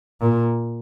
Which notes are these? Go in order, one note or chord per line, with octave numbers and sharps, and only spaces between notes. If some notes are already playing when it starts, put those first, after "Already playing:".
A#2